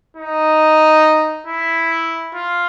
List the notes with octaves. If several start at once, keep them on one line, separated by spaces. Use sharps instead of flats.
D#4
E4
F4